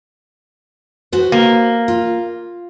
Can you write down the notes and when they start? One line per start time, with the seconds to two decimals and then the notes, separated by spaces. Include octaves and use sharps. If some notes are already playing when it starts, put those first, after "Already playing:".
1.12 F#4 B4 C5
1.32 A#3
1.88 F4